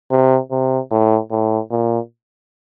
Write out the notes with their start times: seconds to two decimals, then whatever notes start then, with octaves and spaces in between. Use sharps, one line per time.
0.11 C3
0.51 C3
0.91 A2
1.31 A2
1.71 A#2